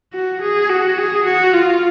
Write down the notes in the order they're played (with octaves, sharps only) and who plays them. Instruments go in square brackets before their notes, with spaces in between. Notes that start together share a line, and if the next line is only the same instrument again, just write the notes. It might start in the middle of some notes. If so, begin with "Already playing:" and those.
[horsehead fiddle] F#4
G#4
F#4
G#4
F#4
F4